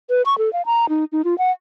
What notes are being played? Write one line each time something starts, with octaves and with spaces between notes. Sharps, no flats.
B4
C#6
A4
F5
A#5
D#4
D#4
F4
F#5